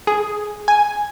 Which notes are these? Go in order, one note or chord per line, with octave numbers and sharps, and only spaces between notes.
G#4
G#5